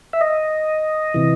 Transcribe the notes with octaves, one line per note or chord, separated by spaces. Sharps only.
E5
D#5
C3 E3